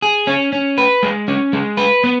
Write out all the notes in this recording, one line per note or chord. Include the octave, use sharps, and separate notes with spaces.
G#4
C#4
C#4
B4
G#3
C#4
G#3
B4
B3